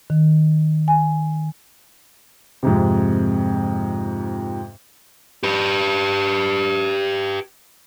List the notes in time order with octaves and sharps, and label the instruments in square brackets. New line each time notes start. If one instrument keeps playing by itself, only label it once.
[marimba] D#3
G#5
[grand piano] F2 G#2 C3
[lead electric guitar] G4 B4